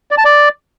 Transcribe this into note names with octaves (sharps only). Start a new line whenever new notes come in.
D5
A5
D5